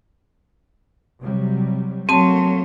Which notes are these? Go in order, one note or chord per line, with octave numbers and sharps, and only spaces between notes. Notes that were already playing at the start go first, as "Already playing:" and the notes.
C3 F#3 G3
F#3 A3 A#3 C4 A5 C6